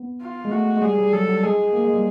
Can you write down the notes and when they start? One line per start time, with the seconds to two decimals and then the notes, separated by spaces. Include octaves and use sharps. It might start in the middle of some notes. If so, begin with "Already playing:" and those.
Already playing: B3
0.21 F4
0.45 G#3
0.51 A3 F#4
0.77 G#3
0.82 G3 G#4
0.98 G3
1.13 F#3 A4
1.28 G3
1.43 G#3 G#4
1.73 A#3
1.85 G#3
1.94 G3